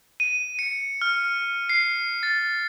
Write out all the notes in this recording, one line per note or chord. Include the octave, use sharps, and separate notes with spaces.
D#7
C#7
F6
C7
A6